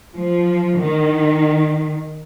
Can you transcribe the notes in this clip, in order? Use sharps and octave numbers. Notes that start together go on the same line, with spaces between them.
F3
D#3